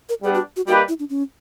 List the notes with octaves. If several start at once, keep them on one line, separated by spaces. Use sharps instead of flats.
A#4
G3 B3 D4 G#4
F#4
F#4
G3 A#3 D#4 F#4 G4 B4
E4
D4
C#4